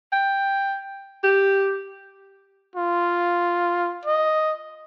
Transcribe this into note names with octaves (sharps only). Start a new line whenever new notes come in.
G5
G4
F4
D#5